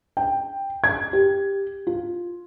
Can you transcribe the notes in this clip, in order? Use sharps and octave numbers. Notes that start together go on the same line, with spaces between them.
G5
G#6
G4
F4